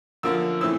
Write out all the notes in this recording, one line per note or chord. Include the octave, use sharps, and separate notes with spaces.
F#2 D3 F3 A#3 E6
A2 E3 A3 C4 E6